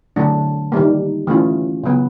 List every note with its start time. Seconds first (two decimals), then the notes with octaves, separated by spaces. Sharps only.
0.16 D3 F#3 A3 D4
0.72 D#3 G3 A#3
1.27 E3 A3 C#4 F4
1.84 C#3 F#3 B3